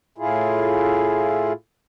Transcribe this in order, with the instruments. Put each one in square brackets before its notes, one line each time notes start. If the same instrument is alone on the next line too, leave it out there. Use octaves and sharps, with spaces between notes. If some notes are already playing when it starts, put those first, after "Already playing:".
[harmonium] A2 E4 F4 G#4